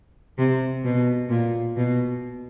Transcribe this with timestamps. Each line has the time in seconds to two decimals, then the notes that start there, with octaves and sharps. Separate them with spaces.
0.38 C3
0.84 B2
1.30 A#2
1.77 B2